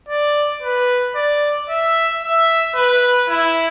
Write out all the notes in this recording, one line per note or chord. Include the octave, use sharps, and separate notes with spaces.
D5
B4
D5
E5
E5
B4
E4